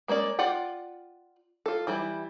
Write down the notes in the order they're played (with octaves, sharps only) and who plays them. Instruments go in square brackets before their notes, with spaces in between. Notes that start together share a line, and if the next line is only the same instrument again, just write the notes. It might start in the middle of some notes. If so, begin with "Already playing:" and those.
[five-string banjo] G#3 A#3 C#4 D5
F4 D5 F#5 G5
F4 A4
E3 G3 E4